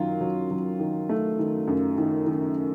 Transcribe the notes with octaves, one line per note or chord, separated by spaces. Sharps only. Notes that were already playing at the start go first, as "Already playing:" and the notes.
Already playing: F#2 D#3 F#3 F4
F#3
F#3
D#3
A3
D#3
F#2
D#3
D#3